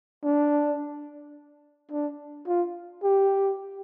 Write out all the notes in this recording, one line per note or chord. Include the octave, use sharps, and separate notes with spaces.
D4
D4
F4
G4